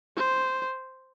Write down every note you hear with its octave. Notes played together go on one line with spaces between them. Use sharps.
C5